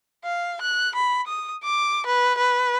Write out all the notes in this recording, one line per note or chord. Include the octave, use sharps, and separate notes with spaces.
F5
F#6
B5
D#6
D6
B4
B4